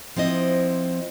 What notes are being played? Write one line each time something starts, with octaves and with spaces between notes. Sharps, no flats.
F3 C4 E4 D#5